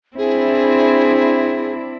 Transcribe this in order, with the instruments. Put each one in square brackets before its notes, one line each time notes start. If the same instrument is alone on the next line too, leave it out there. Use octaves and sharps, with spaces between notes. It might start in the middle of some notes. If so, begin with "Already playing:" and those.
[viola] C4 [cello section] D4 E4 [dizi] G#4